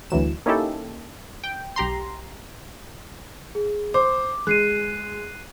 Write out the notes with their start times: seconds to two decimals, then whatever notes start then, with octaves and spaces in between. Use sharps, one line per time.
0.10 D2 E3 F#3 E7
0.46 A#3 C#4 D#4 E4 G4 A4
1.44 G5
1.76 B1 G4 A#5 C6
3.55 G#4
3.94 C5 D6
4.47 G#3 F#6 C7 D#7